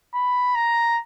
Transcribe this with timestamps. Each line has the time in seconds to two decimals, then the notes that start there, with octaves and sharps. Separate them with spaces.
0.14 B5
0.55 A#5